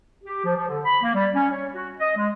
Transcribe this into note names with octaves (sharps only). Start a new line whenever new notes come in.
G4
F3
F3
D3
B5
A#3
G3
C#4
C#5
F#4
D#5
G#3